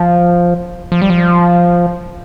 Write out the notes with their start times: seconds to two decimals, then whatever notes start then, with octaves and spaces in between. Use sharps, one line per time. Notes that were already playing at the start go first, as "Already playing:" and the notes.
Already playing: F3
0.92 F3
1.02 G3
1.10 F3